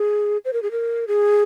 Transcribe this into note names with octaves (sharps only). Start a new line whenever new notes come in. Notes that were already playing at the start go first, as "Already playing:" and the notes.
Already playing: G#4
C5
A#4
G#4
A#4
G#4